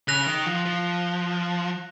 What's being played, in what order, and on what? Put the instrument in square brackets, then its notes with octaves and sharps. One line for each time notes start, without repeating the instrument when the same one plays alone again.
[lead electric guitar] C#3 [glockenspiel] F#6 A#6 F7
[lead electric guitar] D#3
F3
F3